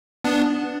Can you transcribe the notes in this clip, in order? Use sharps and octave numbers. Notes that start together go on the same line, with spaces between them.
B3 D4